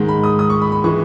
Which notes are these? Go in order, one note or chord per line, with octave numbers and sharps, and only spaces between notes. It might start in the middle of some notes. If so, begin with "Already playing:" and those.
Already playing: G#2 D#3 G#3
B5
D#6
D#6
C#6
B5
B5
E3 G#3 C#6